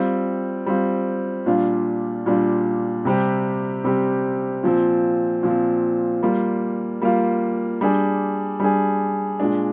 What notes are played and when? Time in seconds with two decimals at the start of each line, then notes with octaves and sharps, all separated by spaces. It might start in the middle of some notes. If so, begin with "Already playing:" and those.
Already playing: G3 C4 F4
0.66 G3 C4 F4
1.46 A#2 G3 D4 F4
2.26 A#2 G3 D4 F4
3.05 C3 G3 C4 G4
3.84 C3 G3 C4 G4
4.63 A#2 F3 C4
5.43 A#2 F3 C4
6.23 G3 A#3 F4
7.02 G3 A#3 F4
7.81 G3 D4 G#4
8.60 G3 D4 G#4
9.40 A#2 G#3 D4